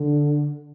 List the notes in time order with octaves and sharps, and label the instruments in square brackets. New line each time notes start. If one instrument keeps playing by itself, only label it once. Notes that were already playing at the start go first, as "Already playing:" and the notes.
Already playing: [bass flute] D3